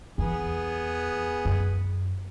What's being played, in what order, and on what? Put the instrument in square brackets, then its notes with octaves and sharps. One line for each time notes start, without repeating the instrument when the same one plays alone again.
[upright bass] E2 [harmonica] B3 G#4
[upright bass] F#2